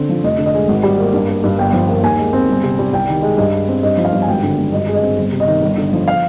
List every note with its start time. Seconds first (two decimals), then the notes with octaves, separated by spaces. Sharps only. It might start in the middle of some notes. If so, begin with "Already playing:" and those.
Already playing: D3 C4
0.09 F3
0.23 F1 D#5
0.38 D3
0.46 D#5
0.54 G#3
0.68 G#1
0.83 G3
0.99 A#3
1.13 G2
1.29 A#3
1.44 G2
1.58 G1 G5
1.73 F3
1.89 A#3
2.03 D#2 G#5
2.19 G#3
2.33 C4
2.48 G1
2.63 C3
2.79 G3
2.93 C2 G5
3.09 D#3
3.22 G#3
3.37 G2 D#5
3.53 G#3
3.68 C4
3.83 G2 D#5
3.98 F3
4.05 F5
4.13 G2
4.22 G#5
4.28 G#1 G5
4.43 D3
4.58 G#1
4.72 G2 D#5
4.88 G#3
4.94 D#5
5.02 C4
5.18 G1
5.32 C3
5.40 D#5
5.47 D#3
5.62 G1
5.78 D3
5.93 F3
6.08 F5